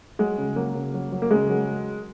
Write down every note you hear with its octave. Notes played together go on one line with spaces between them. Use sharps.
F#3 G#3
C#3
F#3 A#3
C#3
F#3
F#3
A#3
C#3 G#3
F#3